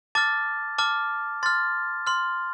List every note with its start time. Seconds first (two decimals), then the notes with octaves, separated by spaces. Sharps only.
0.15 A5 D6 F6 A6
0.78 A5 D6 F6
1.43 C6 F6 A6
2.07 C6 F6